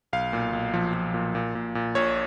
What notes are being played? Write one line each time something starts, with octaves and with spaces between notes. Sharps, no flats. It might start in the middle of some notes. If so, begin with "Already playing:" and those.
B1 F5
A#2
B1
F3
F3
A#2
A#2
A#2
A#2
A#1 C#5